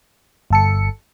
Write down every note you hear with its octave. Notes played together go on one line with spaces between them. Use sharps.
G1 A4 C#7